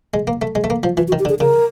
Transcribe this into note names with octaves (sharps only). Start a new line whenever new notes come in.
G#3
A#3
A3
G#3
A3
A#3
F3
E3 F4
F#4
D#3
G4
D3
G#4
C#3 A#4